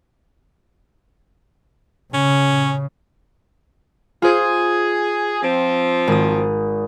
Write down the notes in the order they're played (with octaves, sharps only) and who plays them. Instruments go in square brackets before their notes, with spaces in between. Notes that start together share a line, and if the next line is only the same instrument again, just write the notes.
[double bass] C#3 [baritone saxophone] C#4
[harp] F4 C5 [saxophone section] G#4
[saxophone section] F3 C4
[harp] G#1 D#6